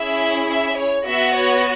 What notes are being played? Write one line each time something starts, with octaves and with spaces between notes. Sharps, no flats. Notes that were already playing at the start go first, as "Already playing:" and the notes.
Already playing: C#4 E4 G#4 E5
E5
C#5
B3 F#4 E5
C#5